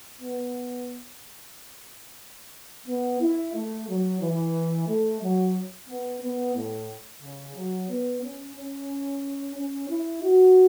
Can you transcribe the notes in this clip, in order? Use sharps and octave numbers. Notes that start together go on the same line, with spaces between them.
B3
B3
E4
A3
F#3
E3
A3
F#3
B3
B3
A2
C#3
F#3
B3
C#4
C#4
C#4
E4
F#4